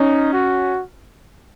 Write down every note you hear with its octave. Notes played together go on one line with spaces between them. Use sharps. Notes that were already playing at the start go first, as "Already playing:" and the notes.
Already playing: C#4 D#4
F#4